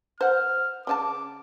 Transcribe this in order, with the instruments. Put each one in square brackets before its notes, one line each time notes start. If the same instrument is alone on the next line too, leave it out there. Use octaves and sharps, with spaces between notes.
[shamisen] C5 F#5 [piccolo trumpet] F6
[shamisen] C#3 D4 A5 [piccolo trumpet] D6